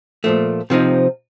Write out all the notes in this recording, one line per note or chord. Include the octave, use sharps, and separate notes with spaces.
A#2 F3 A3
C3 F3 C4 D#4